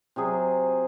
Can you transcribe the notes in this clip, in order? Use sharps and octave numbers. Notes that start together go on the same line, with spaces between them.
C3 F#3 G#4 G#5